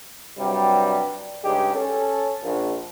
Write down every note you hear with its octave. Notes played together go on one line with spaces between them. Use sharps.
G2 C3 F#3 G3
G2 C#3 G3 G#3 D#4 G4
C#4 A4
A#1